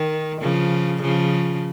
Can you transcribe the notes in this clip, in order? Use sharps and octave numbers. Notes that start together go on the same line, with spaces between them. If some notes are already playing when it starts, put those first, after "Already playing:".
Already playing: D#3
C#3 F3
C#3 F3